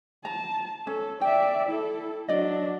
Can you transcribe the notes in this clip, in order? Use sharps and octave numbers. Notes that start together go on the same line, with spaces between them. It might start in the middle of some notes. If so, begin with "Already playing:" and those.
A5 A#5
C#4 A4
D5 E5 G5
E4 A4
F#3 D4 D5 D#5